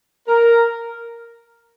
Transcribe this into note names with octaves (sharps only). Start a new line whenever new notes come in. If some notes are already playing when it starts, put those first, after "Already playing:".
A#4